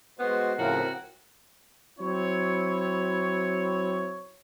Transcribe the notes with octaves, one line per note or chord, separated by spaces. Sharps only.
G#3 B3 F#4 C5
A2 C#3 F3 C4 E4 F#4 A#4
F#3 C4 E4 C#5